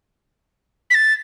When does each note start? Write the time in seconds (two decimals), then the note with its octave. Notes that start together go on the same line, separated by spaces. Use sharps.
0.90 B6
0.95 A6